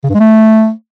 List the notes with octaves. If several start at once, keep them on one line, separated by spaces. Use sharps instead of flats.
C#3
G2
G#3
A3